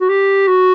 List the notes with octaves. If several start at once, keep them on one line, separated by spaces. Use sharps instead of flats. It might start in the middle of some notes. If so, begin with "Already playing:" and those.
F#4
G4
F#4